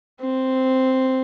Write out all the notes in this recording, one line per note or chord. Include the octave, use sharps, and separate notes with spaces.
C4